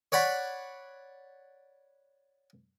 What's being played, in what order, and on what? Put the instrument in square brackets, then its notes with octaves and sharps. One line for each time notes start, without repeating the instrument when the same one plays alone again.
[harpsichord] C#5 D5 F#5 B5